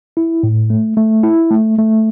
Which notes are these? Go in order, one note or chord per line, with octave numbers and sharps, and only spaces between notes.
E4
A2
A3
A3
E4
A3
A3